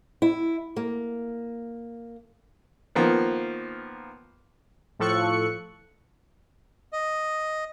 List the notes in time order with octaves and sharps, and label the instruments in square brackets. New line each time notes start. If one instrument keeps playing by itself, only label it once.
[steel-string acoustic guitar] E4
A#3
[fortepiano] D#3 F3 A#3 B3
[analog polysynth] A2 F3 A4 C#6 F#6 C#7
[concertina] D#5